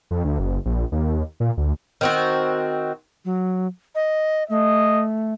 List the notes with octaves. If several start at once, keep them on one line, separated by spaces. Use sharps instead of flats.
F2
D2
F#1
A#1
D#2
A#2
D2
D#3 C4 F#4
F#3
D#5
A3 D#5